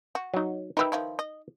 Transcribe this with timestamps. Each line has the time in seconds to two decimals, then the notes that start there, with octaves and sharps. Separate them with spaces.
0.15 F#4
0.34 F#3 D#4
0.77 D#4 G4 A#4 B4 E5
0.92 D#3 F3 E4
1.19 D#5